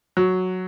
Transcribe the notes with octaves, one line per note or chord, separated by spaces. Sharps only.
F#3